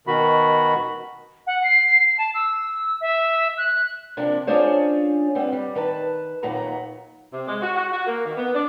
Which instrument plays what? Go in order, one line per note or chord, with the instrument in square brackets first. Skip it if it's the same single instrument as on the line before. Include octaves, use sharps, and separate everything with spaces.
[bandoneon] B2 D#3 F#4 B5
[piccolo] F#5
C7
A5
E6
E5
F#6
[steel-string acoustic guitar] C3 F3 A#3 D4
C#4 D4 F4 G#4 C5 C#5
G3 B3 C4
G3
D#3 B4 A5
D#2 A#2 F#3 B3 A#5
[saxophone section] C3
G#3
F#4
F#4
F#4
A#3
D#3
B3
D4